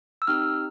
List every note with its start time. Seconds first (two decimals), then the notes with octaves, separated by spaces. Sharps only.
0.22 E6
0.27 C4 D#4 G4 F6